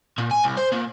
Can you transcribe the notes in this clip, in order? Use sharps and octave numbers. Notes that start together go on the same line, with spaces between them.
A#2
G#5
C2
C5
A#2